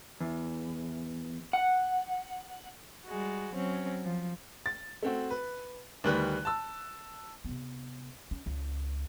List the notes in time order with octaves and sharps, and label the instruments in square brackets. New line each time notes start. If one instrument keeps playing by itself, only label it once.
[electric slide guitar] E2
F#5
[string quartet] G3 G#3 F#4
F#3 C4 C#4
F3
[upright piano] A6
A3 C4 F#4
B4
D2 D#3 G3 B4 F#6
A5 E6
[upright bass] C3 B3
C#4
C#2